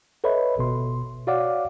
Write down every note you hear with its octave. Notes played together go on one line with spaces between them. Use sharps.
A4 B4 C#5 D#5 E5 B5
G1 B2 C6
F#4 C#5 D5 F5 F#5 D6